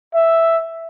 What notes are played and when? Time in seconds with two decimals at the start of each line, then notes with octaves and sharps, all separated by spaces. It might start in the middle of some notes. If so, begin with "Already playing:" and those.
0.14 E5